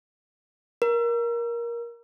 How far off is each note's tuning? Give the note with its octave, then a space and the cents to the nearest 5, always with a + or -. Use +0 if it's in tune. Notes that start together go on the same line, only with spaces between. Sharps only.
A#4 +15